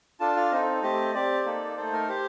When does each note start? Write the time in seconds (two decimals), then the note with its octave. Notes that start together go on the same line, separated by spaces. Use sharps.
0.20 D4 F4 A4 A5
0.36 F5
0.52 C4 D#4 A4 D#5
0.83 A3 C4 G4 D#5
1.14 C4 G4 D5
1.46 A#3 D#4 A4
1.77 A3 D#4 A4 C5
1.93 A#4
2.09 G4 C5